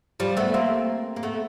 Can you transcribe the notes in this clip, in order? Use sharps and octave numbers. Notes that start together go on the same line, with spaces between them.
F3 G3
A3 B3
A#3 C4
A#3
A3 B3